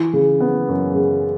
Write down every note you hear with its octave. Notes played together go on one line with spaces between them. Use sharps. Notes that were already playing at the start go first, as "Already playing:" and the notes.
Already playing: E3
C#3
B3
F#2
C#3